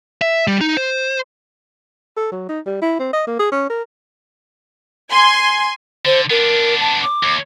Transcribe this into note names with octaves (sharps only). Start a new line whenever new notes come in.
E5
G3
D#4
C5
A4
F#3
D#4
G3
E4
C4
D#5
A#3
G#4
C#4
A#4
G#5 C6
D3 C5
B3 D4 A#4
A5
D6
D#2